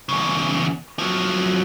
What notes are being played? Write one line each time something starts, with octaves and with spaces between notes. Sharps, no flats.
E2 C#3
F3 F#3